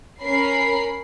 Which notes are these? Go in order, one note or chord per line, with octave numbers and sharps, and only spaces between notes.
C#4 A#4 B5 C7